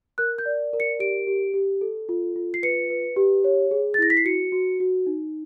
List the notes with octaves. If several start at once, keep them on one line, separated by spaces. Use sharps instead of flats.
A#4 F#6
G6
D5
A#4
C#7
G4 D7
G4
G4
A4
F4
F4
C7
B4 C#7
B4
G4
C#5
G#4
A6
E4 A#6
B6
C7
F#4 C#7
F#4
F#4
D#4